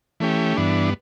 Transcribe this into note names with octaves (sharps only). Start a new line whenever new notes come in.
E3 A3 C#4 G4
G2 E3 B3 D4